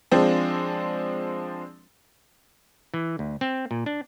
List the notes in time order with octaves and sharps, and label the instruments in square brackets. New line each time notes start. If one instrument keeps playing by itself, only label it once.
[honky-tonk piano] F3 G#3 C4 D4
[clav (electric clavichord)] E3
D2
C4
A#2
D4